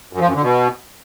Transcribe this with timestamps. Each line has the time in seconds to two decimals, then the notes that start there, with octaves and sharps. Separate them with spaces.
0.13 F#2
0.20 F3
0.28 F#2
0.35 D3
0.42 B2